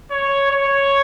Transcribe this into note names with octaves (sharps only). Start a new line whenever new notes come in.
C#5
C#5